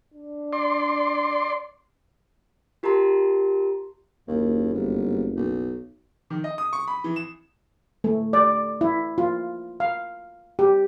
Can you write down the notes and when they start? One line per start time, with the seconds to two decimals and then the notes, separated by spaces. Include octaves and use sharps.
0.14 D4
0.53 D5 C6
2.83 F4 G4 A#4 A5 A#5 C6
4.28 F#1 D#2
4.74 G1
5.36 B1
6.30 D#3
6.44 D#5
6.58 D#6
6.73 C#6
6.88 B5
7.04 E3
7.16 E7
8.04 A3
8.33 D5
8.81 E4
9.18 F4
9.80 F5
10.59 G4